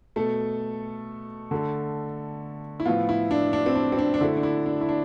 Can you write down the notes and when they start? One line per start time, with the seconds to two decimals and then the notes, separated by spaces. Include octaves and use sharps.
0.16 B2 A3 A4
1.51 D3 A3
2.80 E4
2.85 A2 F3 B3 F4
3.09 E4
3.31 D4
3.53 D4
3.66 C4
3.75 D4
3.92 C4
3.99 D4
4.14 D4
4.21 D3 A3 E4
4.37 D4
4.43 E4
4.66 D4
4.81 E4
4.89 D4